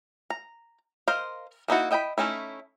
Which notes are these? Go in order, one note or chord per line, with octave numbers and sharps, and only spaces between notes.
A#5
A#4 C5 D#5 F5
A#3 D#4 E4 F#4
E4 D#5 G5 A#5 B5
A3 C#4 D#4 E4